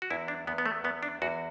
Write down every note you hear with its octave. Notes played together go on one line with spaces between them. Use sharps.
F#4
E2 E4
D4
E2 B3
B3
A3
E2 B3
D4
E2 F#4